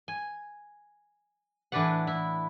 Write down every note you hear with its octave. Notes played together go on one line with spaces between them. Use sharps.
G#5
A2 E3 D4 B4 D5 F#5
E4